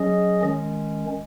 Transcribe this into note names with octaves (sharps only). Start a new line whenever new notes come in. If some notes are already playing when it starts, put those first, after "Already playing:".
Already playing: F#3 C#4 G#4 D#5
D#3 G#3 C#4